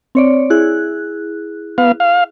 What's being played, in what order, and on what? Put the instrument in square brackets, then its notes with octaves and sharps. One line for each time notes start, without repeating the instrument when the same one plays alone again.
[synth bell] C4 C#5 D5
E4 G#4 F#6
[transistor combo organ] B3 F5
F5